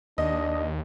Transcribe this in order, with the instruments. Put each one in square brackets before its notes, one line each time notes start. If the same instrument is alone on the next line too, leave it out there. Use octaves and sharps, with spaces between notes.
[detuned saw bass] D#2 [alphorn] D4 [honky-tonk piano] D#5